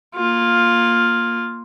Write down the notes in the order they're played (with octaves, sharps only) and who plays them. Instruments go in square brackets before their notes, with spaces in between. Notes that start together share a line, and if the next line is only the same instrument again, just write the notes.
[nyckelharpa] A#3 F4